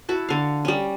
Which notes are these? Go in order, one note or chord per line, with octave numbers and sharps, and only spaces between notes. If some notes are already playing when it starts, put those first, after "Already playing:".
E4 F#4 A5
D3 F5
G3 C#4